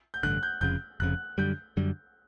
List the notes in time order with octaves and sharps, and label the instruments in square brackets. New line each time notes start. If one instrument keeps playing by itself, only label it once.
[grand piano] G6
[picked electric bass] A1 G2 D3 [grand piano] F#6
[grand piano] G6
[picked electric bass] F1 F2 C#3 [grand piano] G6
[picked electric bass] F1 F2 C#3 [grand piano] F#6
[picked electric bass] F#2 D3 G3 [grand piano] G6
[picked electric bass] F#2 D3 G3